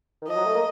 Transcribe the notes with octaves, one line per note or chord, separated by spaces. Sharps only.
D#3
F3 D#5
F#3
A3
A#3